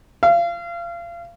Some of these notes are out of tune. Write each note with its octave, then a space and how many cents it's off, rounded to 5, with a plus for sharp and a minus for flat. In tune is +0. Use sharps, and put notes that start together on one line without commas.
F5 -30